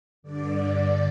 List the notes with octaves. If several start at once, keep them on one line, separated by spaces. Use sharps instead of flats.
G2 D3 D5